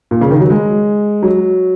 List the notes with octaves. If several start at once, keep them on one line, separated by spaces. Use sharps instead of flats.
A#2
C#3
D#3
F#3
G#3
F#3